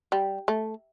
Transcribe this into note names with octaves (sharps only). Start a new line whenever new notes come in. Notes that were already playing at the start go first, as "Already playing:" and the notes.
G3
A3